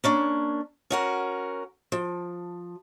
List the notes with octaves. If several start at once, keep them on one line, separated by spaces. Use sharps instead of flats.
A#3 C#4 D4
C#4 F#4 A#4
F3